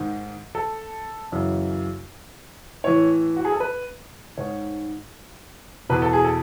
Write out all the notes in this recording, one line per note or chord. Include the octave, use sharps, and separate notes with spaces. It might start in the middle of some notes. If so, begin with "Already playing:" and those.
Already playing: G#2 D#3
A4
F#2 C#3 E3
A2 E3 C#5
F#4
G#4
A4
B4
G#2 D#3 C#5
E2 B2 B4
A4
G#4
A4